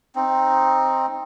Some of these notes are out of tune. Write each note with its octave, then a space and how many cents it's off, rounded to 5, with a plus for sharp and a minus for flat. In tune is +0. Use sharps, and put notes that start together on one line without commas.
C4 +10 D#4 +0